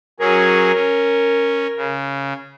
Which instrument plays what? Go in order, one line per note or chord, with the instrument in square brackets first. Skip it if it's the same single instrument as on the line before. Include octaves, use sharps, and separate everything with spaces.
[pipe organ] F#3 C#4 G#4 [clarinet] A#4
[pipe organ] C#4
C#3